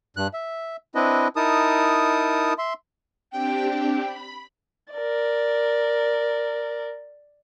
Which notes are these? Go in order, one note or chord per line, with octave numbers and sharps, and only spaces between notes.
G2 F#6
E5
C4 D4 E4 B4 D#5
D#4 E4 A#4 A5 D#6
E5 C6
C4 D4 G4 G5
B5
A#4 D5